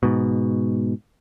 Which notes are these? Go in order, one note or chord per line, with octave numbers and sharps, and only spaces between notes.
G#2 B2